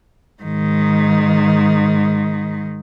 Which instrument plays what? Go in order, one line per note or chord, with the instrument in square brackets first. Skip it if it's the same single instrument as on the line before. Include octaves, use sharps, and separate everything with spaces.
[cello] G#2 D#3